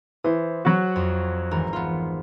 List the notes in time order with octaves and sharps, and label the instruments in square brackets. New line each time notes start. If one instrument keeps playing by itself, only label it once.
[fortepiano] E3 [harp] C5 D#6
[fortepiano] F#3 F#4
[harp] F2
G#1 E3 A#4
B3 F4